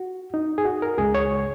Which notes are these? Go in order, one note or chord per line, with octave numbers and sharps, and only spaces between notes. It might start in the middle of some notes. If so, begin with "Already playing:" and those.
Already playing: F#4
D#4
G#4
F#4
A#4
C#2 C#3 G#3 G#4
C#5